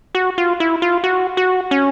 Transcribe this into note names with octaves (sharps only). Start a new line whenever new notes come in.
F#4
F4
E4
F4
F#4
F#4
C#4